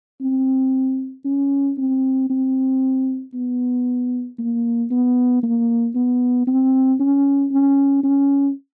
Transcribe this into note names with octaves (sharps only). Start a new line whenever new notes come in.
C4
C#4
C4
C4
B3
A#3
B3
A#3
B3
C4
C#4
C#4
C#4